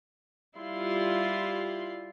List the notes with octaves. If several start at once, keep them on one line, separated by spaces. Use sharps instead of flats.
G3 E4 F4 C6